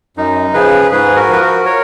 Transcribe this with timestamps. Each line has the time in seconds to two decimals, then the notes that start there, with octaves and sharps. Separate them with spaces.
0.17 F#2 D#4
0.54 C#3 F3 G#4 B4
0.91 G#2 G#4 B4
1.16 F#4 A#4
1.29 F3 B4
1.41 F#4 A#4
1.65 A#4 C#5